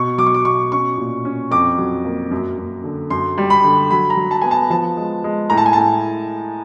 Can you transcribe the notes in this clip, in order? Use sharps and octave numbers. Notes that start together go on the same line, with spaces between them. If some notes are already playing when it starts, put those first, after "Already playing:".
Already playing: B2 C#6
F#3 D6
C#6
D6
B2 C#6
C#4 C#6
A#2
C#4
F2 D6
F#3
A#3
F#2
F#2
D3
F#2 C6
G3
B5
D3
F#3 B5
A#5
F#3
A5
B3 G#5
A5
F3 A5
G#3
G#3
A2 A#5
A5
G#5
A2 A5